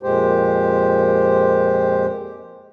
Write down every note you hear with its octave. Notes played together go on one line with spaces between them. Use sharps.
F2 A#2 G#3 G4 C5